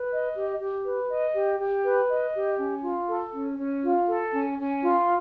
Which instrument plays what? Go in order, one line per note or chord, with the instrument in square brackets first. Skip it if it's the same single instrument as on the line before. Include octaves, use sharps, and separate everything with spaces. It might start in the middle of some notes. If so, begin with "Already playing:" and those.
Already playing: [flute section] B4
D#5
G4
G4
B4
D#5
G4
G4
B4
D#5
G4
C#4
F4
A4
C#4
C#4
F4
A4
C#4
C#4
F4